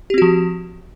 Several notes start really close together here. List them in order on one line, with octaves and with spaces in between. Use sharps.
G4 C4 F#4 F3